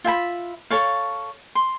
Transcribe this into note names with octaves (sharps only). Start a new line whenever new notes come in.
F4 E5 G#5 B5
A4 C#5 F5
C6